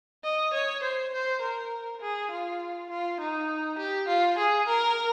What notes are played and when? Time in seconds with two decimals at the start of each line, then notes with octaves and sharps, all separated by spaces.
0.24 D#5
0.53 C#5
0.83 C5
1.13 C5
1.42 A#4
2.01 G#4
2.31 F4
2.90 F4
3.20 D#4
3.78 G4
4.08 F4
4.38 G#4
4.67 A#4